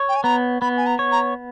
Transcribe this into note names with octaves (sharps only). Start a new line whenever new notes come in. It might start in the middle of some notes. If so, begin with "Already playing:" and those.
Already playing: C#5
G5
G#5
B3 A#5
B3 B5
G#5
A#5
C#5
A#5